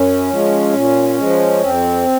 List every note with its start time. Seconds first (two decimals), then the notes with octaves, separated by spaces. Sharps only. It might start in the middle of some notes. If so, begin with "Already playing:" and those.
Already playing: F#2 C#4
0.30 F3 G#3
0.73 A#2
1.18 F3 G#3
1.61 F2 C4